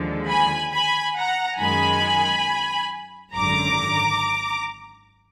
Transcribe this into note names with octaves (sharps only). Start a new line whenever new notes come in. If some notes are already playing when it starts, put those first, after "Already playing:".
Already playing: D#2 D3 F3 G#3
G#5 B5
G#5 B5
F#5 A#5
F#2 D#3 G#3 G#5 B5
G#1 F#2 D3 A#5 D6